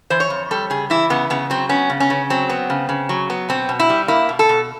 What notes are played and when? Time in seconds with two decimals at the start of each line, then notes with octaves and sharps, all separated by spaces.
0.10 E3 C5
0.20 C#5
0.30 F2
0.51 G3 A4
0.70 C#3 G#4
0.90 E3 E4
1.10 C#3 B3
1.30 C#3 B3
1.50 F#3 C4
1.69 B3 C#4
1.90 C#3
2.00 C#4
2.10 C#3
2.30 F#3 C4
2.49 B3
2.70 C#3
2.89 C#3
3.09 F#3
3.30 B3
3.49 B2 C4
3.69 B2
3.79 E4
3.89 G3
4.08 A#3 E4
4.29 B2
4.39 A4
4.49 B2